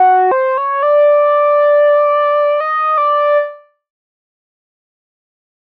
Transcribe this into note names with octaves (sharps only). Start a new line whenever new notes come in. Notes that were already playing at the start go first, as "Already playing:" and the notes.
Already playing: F#4
C5
C#5
D5
D#5
D5